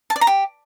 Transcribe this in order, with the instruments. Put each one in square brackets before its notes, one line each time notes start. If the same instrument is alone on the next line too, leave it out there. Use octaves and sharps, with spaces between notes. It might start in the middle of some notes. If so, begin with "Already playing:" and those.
[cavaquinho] A5
D5
A#5
G4